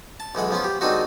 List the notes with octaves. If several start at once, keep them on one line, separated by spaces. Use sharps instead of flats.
A5
B1 E3 G#3 F#5
F3 B3 C#4 F4
G4
D#3 G#3 C4 D4 D#4 F#4